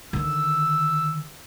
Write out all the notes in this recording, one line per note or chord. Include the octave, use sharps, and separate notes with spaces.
D3 D#3 E6